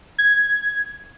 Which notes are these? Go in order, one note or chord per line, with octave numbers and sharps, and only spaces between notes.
G#6